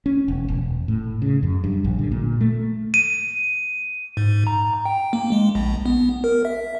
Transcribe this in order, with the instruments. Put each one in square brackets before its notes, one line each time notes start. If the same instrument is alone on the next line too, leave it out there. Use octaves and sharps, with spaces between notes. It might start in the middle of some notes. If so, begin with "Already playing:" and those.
[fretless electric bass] C#4
E1
E1
A2
C#3
F#2
G2
A#1
D3
A#2
A3
[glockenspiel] D#7
[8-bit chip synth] G#2
A#5
G5
A#3
G#3
A#1
B3
A#4
E5